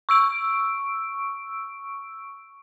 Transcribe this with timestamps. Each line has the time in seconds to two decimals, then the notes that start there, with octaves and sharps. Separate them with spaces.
0.09 C#6 E6 D7